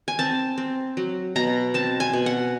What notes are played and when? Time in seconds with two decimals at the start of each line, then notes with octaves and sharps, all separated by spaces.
0.08 G#5
0.19 C4 A5
0.58 C4
0.97 F#3
1.36 B2 A#5
1.74 C4 A5
2.00 G#5
2.13 B2
2.26 F#5